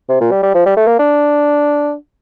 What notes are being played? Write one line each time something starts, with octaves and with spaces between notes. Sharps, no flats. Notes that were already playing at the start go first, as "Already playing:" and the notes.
C3
A#2
G3
G3
F3
G3
A3
A#3
D4